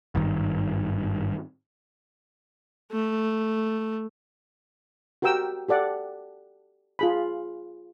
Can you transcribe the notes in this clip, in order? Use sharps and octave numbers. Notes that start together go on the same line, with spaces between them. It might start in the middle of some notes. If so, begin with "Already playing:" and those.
G#1 G2 D#3
A3
F#4 G4 A#4 G5 E6
G4 A4 D5 F#5
F4 G#4 B5